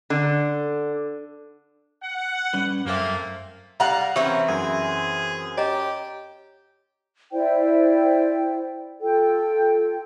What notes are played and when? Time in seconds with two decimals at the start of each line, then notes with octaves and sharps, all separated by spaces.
0.10 D3
2.03 F#5
2.53 G3 C#4 B4
2.85 F#2 A3 A#3 C4 G4 E5
3.80 G3 F5 F#5 A#5 F#6
4.16 E3 C4 C#4 G4 E5 C#6
4.49 F#2 G#4
5.57 G4 C#5 D#5 A#5
7.32 E4 C5 D5 G5
9.01 F4 A4 G5